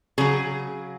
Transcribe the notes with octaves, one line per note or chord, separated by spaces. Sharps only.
C#3 F#3 G#4